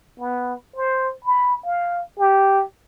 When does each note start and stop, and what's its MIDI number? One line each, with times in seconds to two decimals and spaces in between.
0.19 0.54 59
0.76 1.10 72
1.25 1.56 83
1.65 2.01 77
2.18 2.63 67